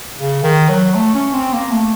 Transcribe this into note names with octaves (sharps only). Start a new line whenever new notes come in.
C#3
D#3
F#3
A3
C#4
C4
A#3
A3